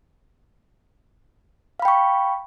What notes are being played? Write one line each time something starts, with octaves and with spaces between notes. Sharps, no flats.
F5 G5 B5 C#6